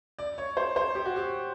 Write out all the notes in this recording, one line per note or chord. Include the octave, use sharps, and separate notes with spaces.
D5
C#5
C5
C5
G4
F#4
G4